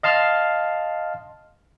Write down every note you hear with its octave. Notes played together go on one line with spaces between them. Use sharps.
D#5 F5 A5 C6 F6